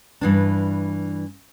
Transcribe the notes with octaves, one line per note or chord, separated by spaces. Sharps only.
G2 E3 D4